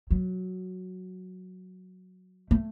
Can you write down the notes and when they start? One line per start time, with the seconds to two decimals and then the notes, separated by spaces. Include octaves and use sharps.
0.11 F#3
2.51 A3